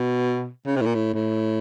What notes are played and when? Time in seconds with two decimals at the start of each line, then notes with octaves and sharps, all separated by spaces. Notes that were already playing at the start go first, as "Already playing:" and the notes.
Already playing: B2
0.66 C#3
0.76 C3
0.81 A2
0.85 A#2
0.95 A2
1.14 A2